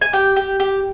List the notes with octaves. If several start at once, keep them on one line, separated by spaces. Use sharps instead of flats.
G#5
G4 G5
G4
G4